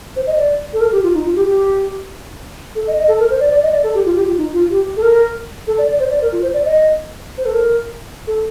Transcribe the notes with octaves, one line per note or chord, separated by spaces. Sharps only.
C5
D#5
D5
A4
A#4
G4
F4
D#4
F4
G4
G4
A4
D#5
D#5
A4
A#4
C5
D5
D5
D#5
D5
A4
G4
F4
G4
F4
D#4
F4
G4
A4
A#4
A4
D5
D5
C5
D5
A#4
F4
C5
D5
D#5
C5
A4
A#4
A4